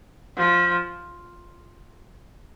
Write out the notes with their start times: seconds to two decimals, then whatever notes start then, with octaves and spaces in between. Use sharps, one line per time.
0.37 F3